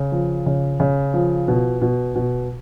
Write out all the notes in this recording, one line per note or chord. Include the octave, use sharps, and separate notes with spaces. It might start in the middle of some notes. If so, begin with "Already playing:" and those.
Already playing: C#3
F3
C#3
C#3
F3
B2
B2
B2